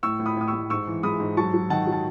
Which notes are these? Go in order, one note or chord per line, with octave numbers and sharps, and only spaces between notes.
A2 C#6 E6
A2
B5 D#6
A2 D#6
C#6 E6
A2
G#2 C#6 E6
E3
G#3 B5 D#6
G#2
F#3 A5 C#6
F#3
D#3 F#5 A5
F#3
A5